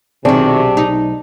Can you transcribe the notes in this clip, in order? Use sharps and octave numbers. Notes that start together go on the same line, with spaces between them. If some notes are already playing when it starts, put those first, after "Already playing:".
B1 C3 D#3 F#3 C4 D4 G#4
D#4